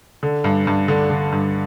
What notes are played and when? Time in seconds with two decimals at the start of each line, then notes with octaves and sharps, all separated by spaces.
0.23 D3
0.44 G2
0.67 G2
0.88 D3
1.10 D3
1.32 G2